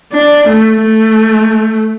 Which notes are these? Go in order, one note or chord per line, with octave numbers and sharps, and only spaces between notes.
D4
A3
A3